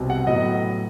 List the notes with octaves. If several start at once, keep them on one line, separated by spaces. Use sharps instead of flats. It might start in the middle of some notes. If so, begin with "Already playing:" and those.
Already playing: C2 B2 C4
F#5
A2 F#3 B3 D#5